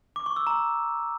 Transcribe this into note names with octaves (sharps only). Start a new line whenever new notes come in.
D6
C#6
E6
A#5